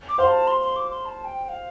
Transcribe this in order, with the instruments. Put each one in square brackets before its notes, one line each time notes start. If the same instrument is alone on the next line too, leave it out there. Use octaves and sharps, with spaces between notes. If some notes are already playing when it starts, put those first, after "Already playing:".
[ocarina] D6
[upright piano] C5 F5 [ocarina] C6
[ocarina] A5
C6
C6
D6
C6
A5
G5
G5
F5